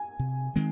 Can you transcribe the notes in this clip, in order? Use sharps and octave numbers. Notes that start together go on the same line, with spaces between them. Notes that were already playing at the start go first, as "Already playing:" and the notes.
Already playing: G#5
C3
D#3 G#3 C4